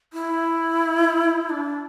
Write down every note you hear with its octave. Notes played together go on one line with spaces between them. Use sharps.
E4
D4